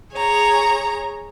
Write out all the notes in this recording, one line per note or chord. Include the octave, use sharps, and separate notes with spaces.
G#4 C#5 A#5